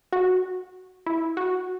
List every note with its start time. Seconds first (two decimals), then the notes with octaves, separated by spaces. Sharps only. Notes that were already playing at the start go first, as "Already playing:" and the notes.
0.12 F#4
1.06 E4
1.37 F#4